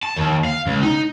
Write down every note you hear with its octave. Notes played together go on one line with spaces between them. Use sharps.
A5
D#2
F5
C#2
D#4